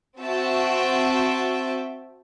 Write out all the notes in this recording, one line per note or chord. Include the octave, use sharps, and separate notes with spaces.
C4 F#4 E5 G5 A5